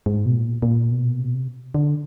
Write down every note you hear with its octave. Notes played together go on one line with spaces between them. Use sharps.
G#2
B2
A#2
A#2
B2
C3
B2
C3
D3